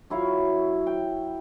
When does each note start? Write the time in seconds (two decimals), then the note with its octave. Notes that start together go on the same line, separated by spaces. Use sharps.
0.10 F#3 E4 C#5 F5
0.87 G5